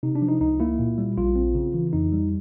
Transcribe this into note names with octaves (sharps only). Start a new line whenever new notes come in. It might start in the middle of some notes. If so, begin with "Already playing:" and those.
C3 D#4
D4
F3
D#4
C#2 D#4
A#3 E4
A#2
G3
A#1 F4
C4
C#3
E3
F2 D#4
G3